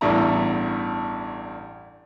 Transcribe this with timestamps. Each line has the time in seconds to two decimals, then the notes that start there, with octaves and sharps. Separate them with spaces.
0.01 A1 E2 G2 A3 E4 A#5